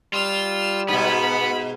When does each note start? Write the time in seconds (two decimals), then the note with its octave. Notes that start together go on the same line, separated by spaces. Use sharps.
0.14 G3 F4 E6
0.89 G#2 B2 B3 B5